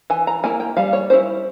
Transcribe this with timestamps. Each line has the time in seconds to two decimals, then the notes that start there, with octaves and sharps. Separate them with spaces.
0.10 E3 G#5
0.27 A#5
0.44 A#3 E4 G#5
0.60 G5
0.77 G3 F5
0.93 C#5
1.10 C#4 E4 C5